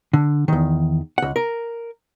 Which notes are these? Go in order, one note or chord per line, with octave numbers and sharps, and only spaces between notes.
D3
E2 D#3
C#2 F#5
A#4